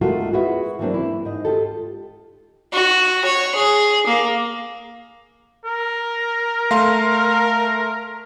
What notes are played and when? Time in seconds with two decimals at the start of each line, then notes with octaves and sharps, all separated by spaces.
0.01 G#3 A3 F4 F#4 A4 A#4
0.33 E4 F#4 G#4 B4 E5 F#5
0.79 E3 F#3 A#3 C4 D4
0.94 E4
1.25 G#2 D#5
1.45 F4 G4 A4
2.73 F#4
3.25 C#5
3.55 G#4
4.07 A#3
5.66 A#4
6.71 A3 F5 C6